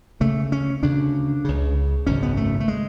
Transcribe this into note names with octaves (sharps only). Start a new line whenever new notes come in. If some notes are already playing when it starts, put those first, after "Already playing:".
D2 C#3 A3
C#4
D2 C#3 D4
C#2 C#3
G#1 F#2 C#3 C#4
B3
A3
A3
G#3